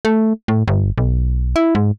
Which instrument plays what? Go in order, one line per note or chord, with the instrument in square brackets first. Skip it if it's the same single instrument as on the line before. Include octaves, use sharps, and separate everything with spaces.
[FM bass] A3
A2
G1
B1
E4
G#2